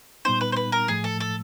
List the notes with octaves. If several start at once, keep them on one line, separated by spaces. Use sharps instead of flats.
A#2 G3 B3 D#4 C5
B4
C5
B4
A#4
A2 F3 A3 G#4
A4
A4